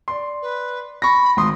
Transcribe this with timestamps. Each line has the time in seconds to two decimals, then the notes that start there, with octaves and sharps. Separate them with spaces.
0.08 D5 C6
0.42 B4
1.02 B5 C#6 A#6
1.37 G#1 C6 D#6